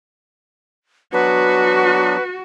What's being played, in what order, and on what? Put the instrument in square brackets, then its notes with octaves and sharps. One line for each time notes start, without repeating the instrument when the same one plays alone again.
[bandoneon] F#3 B3 D4 [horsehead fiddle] F#4 [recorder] B4